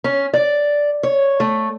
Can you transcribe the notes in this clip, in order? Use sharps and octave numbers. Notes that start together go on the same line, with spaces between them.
C#4
D5
C#5
A3